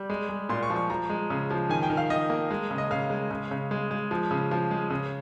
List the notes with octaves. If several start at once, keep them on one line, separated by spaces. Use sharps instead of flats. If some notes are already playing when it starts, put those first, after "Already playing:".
Already playing: G3
G#3
G#3
A#2 C6
C#6
F3
C#6
F3 A#5
G#3
C#3
F3
D#3 G#5
G5
D#3
F5
D#3 D#5
A#3
G#3
C#3
D#5
C#3 F5
G#3
C#3
C#3
G#3
G#3
F3
C#3
F3
G#3
C#3